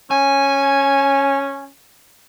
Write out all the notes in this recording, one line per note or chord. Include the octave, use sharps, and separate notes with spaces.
C#4 G#5